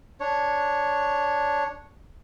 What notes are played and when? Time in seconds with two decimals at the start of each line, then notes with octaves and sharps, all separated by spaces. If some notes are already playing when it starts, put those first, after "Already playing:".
0.20 D4 C#5